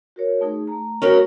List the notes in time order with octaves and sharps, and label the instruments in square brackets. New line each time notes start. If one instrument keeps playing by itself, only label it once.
[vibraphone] F#4 A#4 C#5
A3 D#4 G#4
A3 A#5
[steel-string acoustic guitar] C#4 F#4 A#4